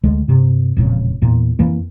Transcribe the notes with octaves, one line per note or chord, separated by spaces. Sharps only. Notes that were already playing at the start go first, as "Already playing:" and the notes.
D2 D3 G#3
G2 C3
E1 F2 A#2 C#3
E2 A#2
F2 E3 A#3